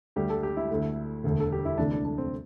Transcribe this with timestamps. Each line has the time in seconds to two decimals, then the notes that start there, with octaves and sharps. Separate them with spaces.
0.16 D2 D3 G3 G4
0.30 A4
0.43 G4
0.57 E4
0.70 D2 D3 A3
1.24 E1 D2 D3 A3
1.40 A4
1.52 G4
1.65 E4
1.77 D2 C3 E3 A3 D4
1.91 D4
2.05 D4
2.18 C4